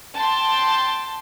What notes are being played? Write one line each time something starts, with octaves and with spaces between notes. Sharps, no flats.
G5 A5 C6